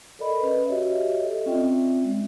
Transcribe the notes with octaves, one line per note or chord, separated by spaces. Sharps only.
A4 A#4 D5 D#5 B5
C#4 B4
F#4 G4 C#5 D#5 E5
A4 D#5
C4 C#4 F4 D5 E5 G5
G#3